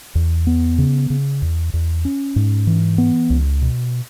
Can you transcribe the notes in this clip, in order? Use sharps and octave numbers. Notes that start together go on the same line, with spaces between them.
E2
B3
C#3
C#3
E2
E2
C#4
G#2
E3
B3
C#2
B2